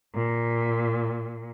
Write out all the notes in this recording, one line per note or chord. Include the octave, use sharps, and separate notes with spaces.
A#2